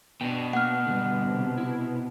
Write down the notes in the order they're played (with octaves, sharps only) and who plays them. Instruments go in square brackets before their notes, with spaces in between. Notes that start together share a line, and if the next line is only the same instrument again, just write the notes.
[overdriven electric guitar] B2 [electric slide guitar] D4 G5
[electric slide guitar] A#3 [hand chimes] F#5 F6
[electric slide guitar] D3 G3
[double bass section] C3
[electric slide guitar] E4